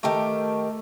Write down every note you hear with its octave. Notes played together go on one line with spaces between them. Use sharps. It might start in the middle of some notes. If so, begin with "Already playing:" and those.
D#3 A3 G4 A#4